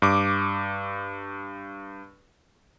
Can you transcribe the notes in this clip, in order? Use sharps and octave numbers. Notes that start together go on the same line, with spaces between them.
G2 D6